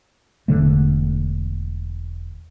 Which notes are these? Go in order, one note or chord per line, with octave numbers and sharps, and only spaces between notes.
E1 D3 A3